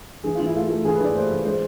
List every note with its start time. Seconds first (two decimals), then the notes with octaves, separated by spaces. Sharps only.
0.24 E3 G#4
0.35 E3 F4
0.46 E4
0.54 A3 F4
0.70 A3
0.85 E3 G#4
0.95 B4
1.00 E3 D5
1.15 A3 C5
1.30 E3
1.45 G#3 C5